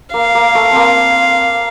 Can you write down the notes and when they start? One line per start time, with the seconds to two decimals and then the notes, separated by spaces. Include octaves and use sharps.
0.14 A#3 F5
0.35 A#3
0.55 A3
0.71 A#3 C4